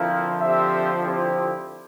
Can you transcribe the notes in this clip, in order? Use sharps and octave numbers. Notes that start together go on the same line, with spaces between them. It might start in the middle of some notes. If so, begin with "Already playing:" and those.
Already playing: D3 F3 C4 E4 A#4 F5
C4 G4 C5 E5
C4 E4 G4 C5